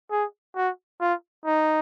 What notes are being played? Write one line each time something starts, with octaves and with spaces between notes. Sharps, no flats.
G#4
F#4
F4
D#4